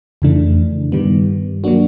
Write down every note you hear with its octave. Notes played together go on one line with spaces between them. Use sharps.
F2 C#3 E3 A3 D4
G2 D#3 G3 B3
F#3 A#3 D4 F#4